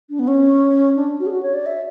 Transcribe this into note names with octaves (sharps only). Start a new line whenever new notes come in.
D4
B3
C#4
D4
F#4
G#4
F#4
C#5
D5
E5